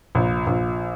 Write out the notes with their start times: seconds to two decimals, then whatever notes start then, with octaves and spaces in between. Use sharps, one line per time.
0.15 A#1
0.47 A#1